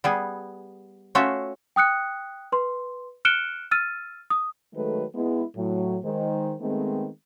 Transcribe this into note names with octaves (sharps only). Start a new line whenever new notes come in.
G3 B3 G#4
A3 C#4 F4 F#4 E5
G5 D#6 F#6 C#7
B4 C6
F6 F#6 C#7 D7 E7 G7
E6 F6 A6 D#7
D#6
D#3 F#3 G#3 A3 A4 B4
G#3 B3 E4
A2 F#3
D#3 G#3 C5
D#3 G#3 A3 B3 C4